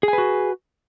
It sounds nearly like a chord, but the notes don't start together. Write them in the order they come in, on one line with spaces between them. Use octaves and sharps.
G#4 G#5 B4 F#4